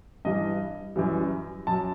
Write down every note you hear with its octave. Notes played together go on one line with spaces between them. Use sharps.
G2 E3 G3 D#5
F#2 E3 G3
F#2 F#3 A5